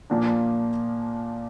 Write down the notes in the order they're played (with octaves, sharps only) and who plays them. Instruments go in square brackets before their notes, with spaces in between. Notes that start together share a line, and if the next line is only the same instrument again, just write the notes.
[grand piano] A#2 F3 A#3 D4